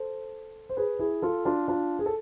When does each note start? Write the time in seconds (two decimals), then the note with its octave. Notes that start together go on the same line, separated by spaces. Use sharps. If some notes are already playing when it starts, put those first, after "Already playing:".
Already playing: A4 C5
0.70 C5
0.77 G#4 B4
0.99 E4 G#4
1.22 F4 A4
1.45 D4 F4
1.68 D4 F4
1.99 G#4
2.06 A4